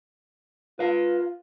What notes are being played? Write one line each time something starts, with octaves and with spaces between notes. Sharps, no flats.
F4 B4 F5